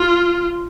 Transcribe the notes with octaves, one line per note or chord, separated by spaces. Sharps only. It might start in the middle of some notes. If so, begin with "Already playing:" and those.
Already playing: F4